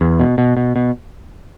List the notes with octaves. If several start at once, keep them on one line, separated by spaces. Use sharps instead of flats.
E2
B2
B2
B2
B2